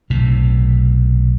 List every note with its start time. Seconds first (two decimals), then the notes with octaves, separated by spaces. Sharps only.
0.10 B1 A2 C3